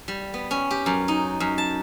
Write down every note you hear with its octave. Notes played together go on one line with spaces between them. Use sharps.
G3
B3
C#4
G4
F#2
D#4
F#2
A5